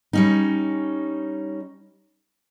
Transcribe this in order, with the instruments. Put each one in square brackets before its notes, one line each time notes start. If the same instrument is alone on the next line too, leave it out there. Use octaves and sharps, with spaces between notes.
[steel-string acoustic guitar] G3 C#4 D#4